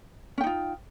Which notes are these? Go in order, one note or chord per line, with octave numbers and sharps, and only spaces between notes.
C#4 D#4 F4 G5